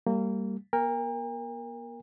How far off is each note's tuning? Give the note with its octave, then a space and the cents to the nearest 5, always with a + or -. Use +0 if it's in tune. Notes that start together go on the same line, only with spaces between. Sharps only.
G3 +0 A#3 -25
A#3 +45 A#4 +0 G5 +45